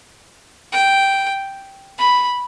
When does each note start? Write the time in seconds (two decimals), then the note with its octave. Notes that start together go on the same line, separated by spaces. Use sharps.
0.72 G5
1.98 B5